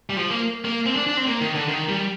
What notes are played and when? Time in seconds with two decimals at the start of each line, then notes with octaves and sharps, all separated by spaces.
0.10 G3
0.17 F3
0.30 A#3
0.65 A#3
0.86 C4
0.96 D4
1.07 D4
1.17 C4
1.27 A#3
1.41 D#3
1.55 D3
1.68 D#3
1.89 G3